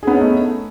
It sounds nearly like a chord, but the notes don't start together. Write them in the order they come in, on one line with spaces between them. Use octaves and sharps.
G#4 B3 C#4 D#4 A3